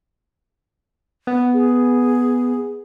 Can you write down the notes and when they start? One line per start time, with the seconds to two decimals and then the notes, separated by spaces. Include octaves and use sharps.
1.27 B3
1.54 G#4